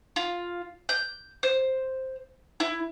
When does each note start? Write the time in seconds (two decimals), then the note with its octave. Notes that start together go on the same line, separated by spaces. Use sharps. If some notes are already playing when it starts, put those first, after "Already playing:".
0.16 F4
0.89 G6
1.43 C5
2.60 E4